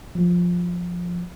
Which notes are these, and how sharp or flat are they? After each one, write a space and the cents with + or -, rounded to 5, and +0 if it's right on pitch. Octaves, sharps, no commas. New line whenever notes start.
F3 +10